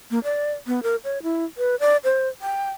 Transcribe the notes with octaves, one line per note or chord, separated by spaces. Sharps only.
A#3
D5
B3
A#4
C#5
E4
B4
D5
C5
G5